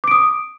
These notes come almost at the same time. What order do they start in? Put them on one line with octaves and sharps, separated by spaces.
D6 D7 D#6